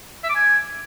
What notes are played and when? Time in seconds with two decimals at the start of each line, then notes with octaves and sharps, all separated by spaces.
0.23 E5
0.29 D6
0.35 G#5